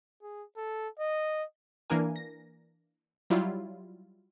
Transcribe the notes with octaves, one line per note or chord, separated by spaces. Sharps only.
G#4
A4
D#5
E3 A#3 D4 A#4 G#5
A#6
F#3 G3 E4 F4